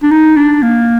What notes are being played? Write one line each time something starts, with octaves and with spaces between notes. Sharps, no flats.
D4
D#4
D4
A#3